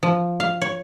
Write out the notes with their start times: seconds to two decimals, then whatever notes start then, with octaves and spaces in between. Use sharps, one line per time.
0.03 F3
0.40 F5
0.62 C#5